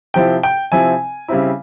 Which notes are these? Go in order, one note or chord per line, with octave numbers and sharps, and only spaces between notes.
C3 F3 C4 E4 G5
G5
C3 F3 C4 E4 G#5
C#3 G3 C4 E4